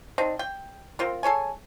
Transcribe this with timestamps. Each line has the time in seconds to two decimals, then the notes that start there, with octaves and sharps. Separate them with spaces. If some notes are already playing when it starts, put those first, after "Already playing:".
0.18 C4 D4 D#4
0.39 G5
0.99 C4 F4 A#4
1.23 G#4 A4 C#5 G#5